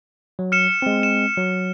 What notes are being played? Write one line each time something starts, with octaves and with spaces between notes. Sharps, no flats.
F#3
F6 C#7 E7
G#3 C4
E7
F#3